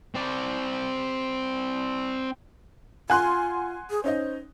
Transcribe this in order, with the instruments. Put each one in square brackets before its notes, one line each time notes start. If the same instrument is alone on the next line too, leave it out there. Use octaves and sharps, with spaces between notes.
[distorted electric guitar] C4 D5
[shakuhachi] F4 [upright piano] F#5 F#6 [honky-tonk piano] G#5 C6
[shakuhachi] G#4
[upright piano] C#4 D#4 D#5 [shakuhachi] C5